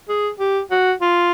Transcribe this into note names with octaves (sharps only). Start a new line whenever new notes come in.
G#4
G4
F#4
F4